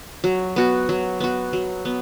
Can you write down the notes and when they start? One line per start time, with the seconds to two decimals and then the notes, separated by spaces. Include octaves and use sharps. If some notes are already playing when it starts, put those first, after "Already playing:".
0.24 F#3
0.56 B3 F#4
0.89 F#3
1.20 B3 F#4
1.53 F#3
1.85 B3